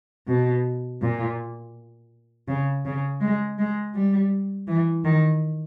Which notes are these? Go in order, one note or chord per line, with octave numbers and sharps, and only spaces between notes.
B2
A#2
C#3
C#3
G#3
G#3
G3
E3
D#3